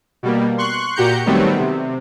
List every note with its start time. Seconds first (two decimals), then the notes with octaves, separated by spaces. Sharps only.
0.23 B2 G3 A#3
0.58 C6 C#6 F#6
0.96 A#2 F#4 G4 A#5 G6 C#7
1.26 D#3 F#3 G3 A3 B3 C4
1.59 C3